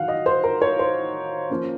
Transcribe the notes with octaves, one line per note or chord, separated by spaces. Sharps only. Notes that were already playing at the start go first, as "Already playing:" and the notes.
Already playing: D#3 F#3 F5 F#5
D#5
C5
A#4
C#5
C5
F3 A#3 C#4